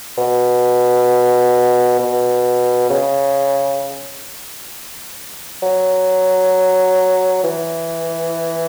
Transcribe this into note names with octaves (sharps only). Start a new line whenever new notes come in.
B2
B2
C#3
F#3
E3